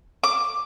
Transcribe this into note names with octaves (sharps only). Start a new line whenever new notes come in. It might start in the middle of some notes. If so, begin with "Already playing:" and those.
D6